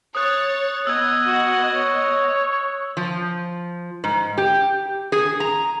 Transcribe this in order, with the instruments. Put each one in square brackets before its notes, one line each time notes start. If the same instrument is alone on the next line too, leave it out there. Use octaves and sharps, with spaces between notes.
[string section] C#5 A6 [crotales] D#6 F#6
[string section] B3 D#5 [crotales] E6 G#6
[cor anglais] F#4
C#5
[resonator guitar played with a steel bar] F3
G#2
G4
G#4
A#5